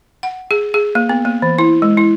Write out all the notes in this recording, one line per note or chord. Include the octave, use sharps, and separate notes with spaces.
F#5
G#4
G#4
A#3
B3
A#3
E3
E4
G#3
E4